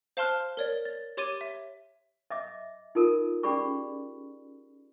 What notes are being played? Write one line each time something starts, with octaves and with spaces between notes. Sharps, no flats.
C5 F5 A5 C6 F6 F#6
A#4 C#5 D5
A6
G4 C#5 C6 D6 A6 D#7
E5
D#5 E5 D6
D#4 F4 A4 A#4
C#4 G4 G#4 D5 B5 C#6